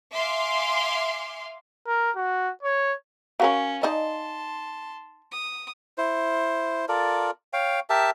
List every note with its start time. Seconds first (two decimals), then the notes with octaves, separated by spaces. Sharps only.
0.15 E5 F5 G#5 C6 D6 F6
1.87 A#4
2.16 F#4
2.63 C#5
3.40 C#4 F#4 A#4 C#5 F5 G#5
3.83 D#4 D5 D#5 A5 C6
5.32 D#6
5.98 E4 C5
6.88 F4 A4 A#4 D5
7.53 C#5 F5 G5
7.90 G4 A#4 E5 A5